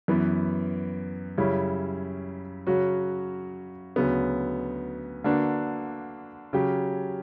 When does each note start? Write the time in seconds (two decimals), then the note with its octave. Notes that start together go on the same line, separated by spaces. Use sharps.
0.08 F#2 E3 B3
1.38 F#2 C#3 G3 C#4 E4
2.67 C#3 F#3 C#4 F#4
3.96 D2 C#3 F#3 B3
5.24 D3 A#3 D4 F#4 B4
6.53 C#3 F#3 C#4 G4